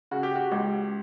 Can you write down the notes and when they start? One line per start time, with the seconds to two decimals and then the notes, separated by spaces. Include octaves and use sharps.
0.11 C#3 F#4
0.23 G4
0.35 F#4
0.51 C#2 G4